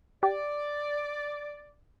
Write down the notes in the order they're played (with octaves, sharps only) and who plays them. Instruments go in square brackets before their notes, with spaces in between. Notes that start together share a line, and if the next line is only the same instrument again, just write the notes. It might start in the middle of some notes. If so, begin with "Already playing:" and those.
[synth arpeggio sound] G4 [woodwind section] D5